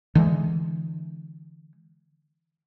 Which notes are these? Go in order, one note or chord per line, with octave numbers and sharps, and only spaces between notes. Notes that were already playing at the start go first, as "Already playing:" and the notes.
D3 E3 G#3